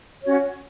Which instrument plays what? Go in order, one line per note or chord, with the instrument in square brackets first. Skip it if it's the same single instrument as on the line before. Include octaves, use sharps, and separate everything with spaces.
[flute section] C#4 F#4 C#5